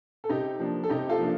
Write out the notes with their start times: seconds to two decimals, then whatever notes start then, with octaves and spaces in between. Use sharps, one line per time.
0.24 A4
0.29 C3 D#4 G4
0.59 F3 A#3 D4
0.83 A4
0.89 C3 D#4 G4
1.09 F4 A4
1.19 F3 A#3 D4